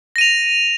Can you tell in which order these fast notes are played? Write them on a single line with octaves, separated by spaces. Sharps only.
A#6 D#7 F7